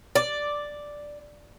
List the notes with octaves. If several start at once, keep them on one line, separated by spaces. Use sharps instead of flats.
D5